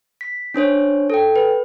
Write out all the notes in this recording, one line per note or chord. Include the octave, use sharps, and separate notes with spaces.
B6
C#4 D4 C5 C#5
A4 G5
B4